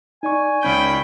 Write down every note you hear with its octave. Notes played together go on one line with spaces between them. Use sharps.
D#4 D5 G#5 C#6
C#2 C#4 G5 B5 G6